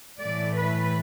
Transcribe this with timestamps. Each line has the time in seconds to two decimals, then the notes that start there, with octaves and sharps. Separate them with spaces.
0.20 A2 E3 A3 D5
0.56 B4